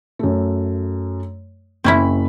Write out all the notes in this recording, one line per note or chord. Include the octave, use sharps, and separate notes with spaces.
F#2 A3
F#1 C4 C#4 E4 B5